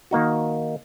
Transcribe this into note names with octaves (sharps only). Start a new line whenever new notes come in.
D#3 A#3 D#4 F#4